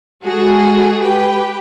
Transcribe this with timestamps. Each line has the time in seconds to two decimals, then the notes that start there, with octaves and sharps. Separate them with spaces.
0.24 G#3 F#4 G#4 A4
0.99 G4 B4 G5